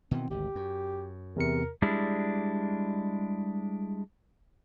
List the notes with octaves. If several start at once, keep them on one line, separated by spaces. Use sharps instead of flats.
B2 D#3 E3 C4
G#1 D2 G4
F#2
E2 C3 A#4 C#7
G3 G#3 D4 E4